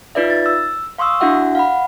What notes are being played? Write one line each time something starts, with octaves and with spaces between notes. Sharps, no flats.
D#4 F4 B4 D5 E5
A6
E6
F5 C6 C#6 D#6 E6
D4 E4 F#4 E5 F#5
F5 F#5 B5